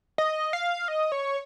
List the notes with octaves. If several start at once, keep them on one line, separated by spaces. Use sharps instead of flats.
D#5
F5
D#5
C#5